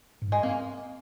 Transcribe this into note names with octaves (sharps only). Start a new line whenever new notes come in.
G#2
G#3
A#3 C4